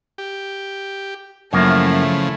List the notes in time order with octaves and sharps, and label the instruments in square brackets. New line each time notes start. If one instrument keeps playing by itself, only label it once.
[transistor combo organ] G4
[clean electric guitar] F#2 A#3 [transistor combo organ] C#3 F3 [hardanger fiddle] A3 E4